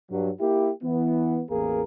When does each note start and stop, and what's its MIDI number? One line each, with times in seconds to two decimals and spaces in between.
0.11 0.31 43
0.11 0.31 54
0.40 0.71 58
0.40 0.71 64
0.40 0.71 67
0.84 1.43 52
0.84 1.43 59
1.50 1.82 33
1.50 1.82 40
1.50 1.82 58
1.50 1.82 68
1.50 1.82 70